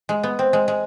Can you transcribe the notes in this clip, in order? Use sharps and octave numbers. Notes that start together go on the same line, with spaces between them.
G#3
B3
C4
G#3
G#3